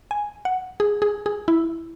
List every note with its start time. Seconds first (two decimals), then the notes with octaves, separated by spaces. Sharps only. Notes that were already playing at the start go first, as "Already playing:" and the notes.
0.11 G#5
0.45 F#5
0.80 G#4
1.02 G#4
1.26 G#4
1.48 E4